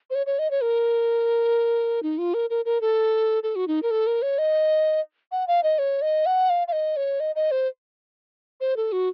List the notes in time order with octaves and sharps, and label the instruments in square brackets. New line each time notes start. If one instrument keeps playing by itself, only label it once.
[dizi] C5
C#5
C#5
D#5
C#5
A#4
D#4
F4
A#4
A#4
A#4
A4
A4
F#4
D#4
A#4
A4
A#4
C#5
D#5
F#5
F5
D#5
C#5
D#5
F#5
F5
F5
D#5
C#5
D#5
D#5
C5
C5
A4
F#4